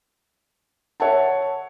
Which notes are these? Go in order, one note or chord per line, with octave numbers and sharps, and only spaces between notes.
C#5 E5 F#5 A5